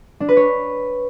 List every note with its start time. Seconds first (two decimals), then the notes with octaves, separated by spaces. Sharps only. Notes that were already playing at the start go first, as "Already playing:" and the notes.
0.20 D4
0.29 B4
0.37 C#5